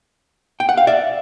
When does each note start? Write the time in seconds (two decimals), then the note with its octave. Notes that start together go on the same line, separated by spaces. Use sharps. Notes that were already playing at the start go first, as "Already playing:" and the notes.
0.60 G5
0.69 F#5
0.77 F5
0.87 D5 E5